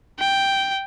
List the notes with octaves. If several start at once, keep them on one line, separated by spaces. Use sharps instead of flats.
G5